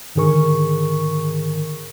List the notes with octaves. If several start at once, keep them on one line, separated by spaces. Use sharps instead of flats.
G#2 D3 D#3 G#4 A#4 C#6